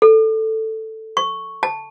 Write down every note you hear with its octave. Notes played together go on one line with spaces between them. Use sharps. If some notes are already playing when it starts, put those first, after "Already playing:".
A4
C#6
A5